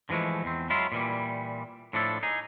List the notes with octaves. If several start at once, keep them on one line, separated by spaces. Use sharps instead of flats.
D3 E3 F3 G#3 A3
E2 C4
F#3 G#3 E4 F4
A#2 E3 G3
A2 F3 D4 E4 A4
D#4 G#4